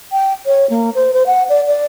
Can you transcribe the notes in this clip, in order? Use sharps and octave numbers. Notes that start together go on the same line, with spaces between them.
G5
C#5
A#3
C5
C5
F#5
D5
D5